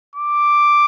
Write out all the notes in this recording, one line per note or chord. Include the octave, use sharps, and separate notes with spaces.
D6